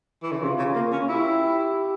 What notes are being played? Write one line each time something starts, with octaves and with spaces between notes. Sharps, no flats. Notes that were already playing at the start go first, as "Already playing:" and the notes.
E3
C#3
C3 F4
C#3
A#3
C#4
E4 G4